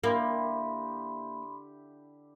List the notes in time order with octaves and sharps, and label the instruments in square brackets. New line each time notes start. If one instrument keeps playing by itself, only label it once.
[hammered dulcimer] D3 E4 G4 [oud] A#3 [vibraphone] B5 C6